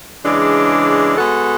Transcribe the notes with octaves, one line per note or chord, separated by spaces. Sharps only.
C#3 E3 G#3 D4
G#3 B3 F#4 A4